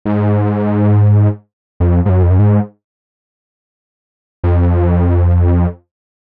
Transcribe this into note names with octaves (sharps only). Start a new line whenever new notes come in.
G#2
F2
G#2
F#2
F2
F#2
G#2
F2